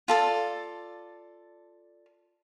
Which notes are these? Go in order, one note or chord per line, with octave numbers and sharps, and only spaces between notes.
F4 A4 D5